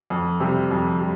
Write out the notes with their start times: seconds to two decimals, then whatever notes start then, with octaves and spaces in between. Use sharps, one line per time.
0.10 F2
0.40 C3 G3
0.71 F2
1.00 G3